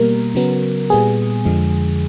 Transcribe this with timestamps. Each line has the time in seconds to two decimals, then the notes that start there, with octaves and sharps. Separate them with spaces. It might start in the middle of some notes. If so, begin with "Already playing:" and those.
Already playing: B2 G3 A#3 A#4
0.35 C#3 F#3 B3
0.90 A#2 G3 B3 G#4
1.45 F2 D3 F3 G#3